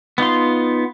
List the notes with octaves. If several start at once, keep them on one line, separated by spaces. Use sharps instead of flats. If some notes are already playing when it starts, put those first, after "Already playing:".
B3 D#4 F4 C6